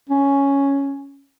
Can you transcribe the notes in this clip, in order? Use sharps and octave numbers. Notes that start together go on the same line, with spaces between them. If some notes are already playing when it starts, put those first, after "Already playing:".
C#4